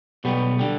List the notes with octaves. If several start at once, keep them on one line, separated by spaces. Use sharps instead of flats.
B1 B2 G3 B3
D3 G3